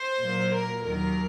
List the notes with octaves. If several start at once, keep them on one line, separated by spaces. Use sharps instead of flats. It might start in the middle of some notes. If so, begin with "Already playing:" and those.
Already playing: C5
A#2 F#3 A#3
A#4
D#2 D#3 F#3 A#4